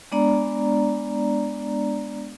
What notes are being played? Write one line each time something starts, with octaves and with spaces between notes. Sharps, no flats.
G#3 B3 D4 D5 A#5